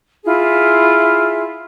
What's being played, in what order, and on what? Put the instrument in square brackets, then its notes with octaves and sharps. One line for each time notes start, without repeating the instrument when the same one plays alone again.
[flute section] E4 F4 G#4